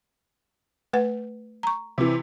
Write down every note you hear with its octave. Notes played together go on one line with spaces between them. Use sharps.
A3 B4 F#5
A#5 C#6
C3 E3